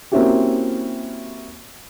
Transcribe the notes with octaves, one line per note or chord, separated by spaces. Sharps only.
A#3 C4 C#4 E4 F#4 G4